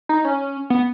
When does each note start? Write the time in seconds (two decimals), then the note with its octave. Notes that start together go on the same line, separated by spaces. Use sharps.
0.09 D#4
0.25 C#4
0.70 B3